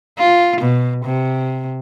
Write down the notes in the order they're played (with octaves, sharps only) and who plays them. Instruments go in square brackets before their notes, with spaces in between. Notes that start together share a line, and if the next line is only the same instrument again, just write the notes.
[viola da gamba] F4
B2
C3